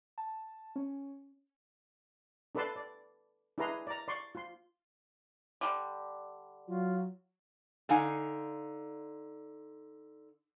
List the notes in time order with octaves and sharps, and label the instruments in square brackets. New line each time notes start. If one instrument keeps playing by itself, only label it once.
[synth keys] A5
C#4
[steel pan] D4 A4 B4 D5 A5 C6
D5
D4 E4 G#4 B4 A#5 C6
D5 A#5
D5 C6 C#6
F4 C6
[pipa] D3 G3
[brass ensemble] F#3 [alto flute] F4
[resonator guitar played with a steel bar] D3 D#4 F5 G#5